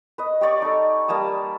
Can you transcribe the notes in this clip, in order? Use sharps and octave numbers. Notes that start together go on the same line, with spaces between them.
B4 D#5
G4 C#5 D5 C#6
D#4 A4
G3 A#3 A5 D#6